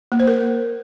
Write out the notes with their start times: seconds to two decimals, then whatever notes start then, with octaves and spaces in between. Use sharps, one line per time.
0.12 A#3
0.20 C5
0.27 A#4